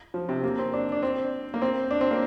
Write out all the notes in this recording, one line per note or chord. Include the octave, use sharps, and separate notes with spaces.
F3
C3
A#3
C4
D4
D4
C4
A#3
C4
D4
C4
A#3